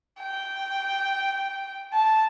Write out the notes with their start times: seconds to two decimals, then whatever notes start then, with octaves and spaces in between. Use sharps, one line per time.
0.20 G5
1.93 A5